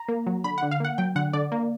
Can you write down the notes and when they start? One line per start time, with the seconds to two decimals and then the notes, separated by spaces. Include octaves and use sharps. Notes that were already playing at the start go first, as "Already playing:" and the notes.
Already playing: A#5
0.08 A#3
0.26 F#3
0.44 D3 B5
0.58 D3 F#5
0.71 F5
0.80 A#3 F#5
0.98 F#3 G5
1.16 D3 F#5
1.33 D3 D5
1.52 A#3